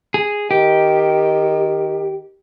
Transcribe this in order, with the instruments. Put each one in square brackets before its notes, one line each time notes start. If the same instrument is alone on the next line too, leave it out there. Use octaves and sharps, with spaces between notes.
[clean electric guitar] G#4
[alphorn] D#3 [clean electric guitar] G4